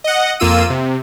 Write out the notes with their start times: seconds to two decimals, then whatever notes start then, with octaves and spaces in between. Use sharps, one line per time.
0.04 D#5 F#5
0.40 F2 A#3 F4 E6 D#7
0.70 C3